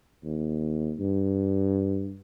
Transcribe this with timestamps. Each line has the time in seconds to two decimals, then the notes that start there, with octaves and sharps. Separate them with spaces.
0.24 D#2
1.00 G2